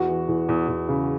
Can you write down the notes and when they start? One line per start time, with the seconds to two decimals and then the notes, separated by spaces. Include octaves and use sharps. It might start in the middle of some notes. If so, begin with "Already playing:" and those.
Already playing: E2 F#4
0.09 E3
0.28 E2
0.49 E2
0.68 E2
0.89 C#3